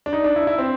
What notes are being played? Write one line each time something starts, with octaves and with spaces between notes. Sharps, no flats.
D4
D#4
D4
E4
E4
C4